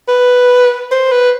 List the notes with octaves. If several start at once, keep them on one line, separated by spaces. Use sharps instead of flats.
B4
C5
B4